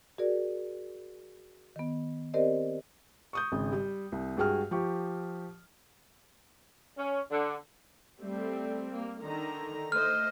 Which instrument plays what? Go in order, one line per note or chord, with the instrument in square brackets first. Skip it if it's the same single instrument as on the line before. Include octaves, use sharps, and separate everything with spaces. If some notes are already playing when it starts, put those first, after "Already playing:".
[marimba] F#4 G#4 A#4 D5
D#3 B3
C4 G4 A#4 C5 D5 D#5
[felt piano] C#6 D#6 G6
G#1 C#3
G3
C2
G2 G#3 F#4 G#4 G5 F6
F3 G4 C#6
[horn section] C#4
D3
[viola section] G3 A3 C4
A#3
D3 D#3 A#5
[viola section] A3 C5 D#5 [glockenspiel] F6